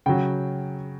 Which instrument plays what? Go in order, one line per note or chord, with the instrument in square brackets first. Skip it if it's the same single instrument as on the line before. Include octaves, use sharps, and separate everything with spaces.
[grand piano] C#3 F#3 G5